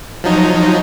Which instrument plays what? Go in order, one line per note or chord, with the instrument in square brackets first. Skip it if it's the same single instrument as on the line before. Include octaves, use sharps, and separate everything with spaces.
[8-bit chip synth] F3 F#3 D#4